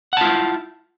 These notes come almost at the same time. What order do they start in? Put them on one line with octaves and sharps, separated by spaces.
F#5 A5 F4 E4